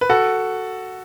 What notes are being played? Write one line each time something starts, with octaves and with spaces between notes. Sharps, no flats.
B4
F#4 A4